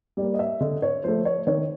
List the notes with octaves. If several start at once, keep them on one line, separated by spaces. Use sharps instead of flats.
G3 A#3 D5
D#5
E5
D3 D#5
C#5
F3 A3 C5
C#5
D#3 C#5